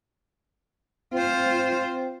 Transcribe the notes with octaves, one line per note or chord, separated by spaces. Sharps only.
C4 F4 C5